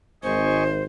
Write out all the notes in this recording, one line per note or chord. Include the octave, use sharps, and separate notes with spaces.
G#1 C5 D#5 G#5 C#6